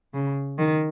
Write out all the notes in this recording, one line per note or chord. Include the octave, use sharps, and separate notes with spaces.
C#3
D#3